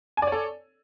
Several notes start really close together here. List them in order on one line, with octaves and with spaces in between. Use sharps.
G#5 D5 C#5 A4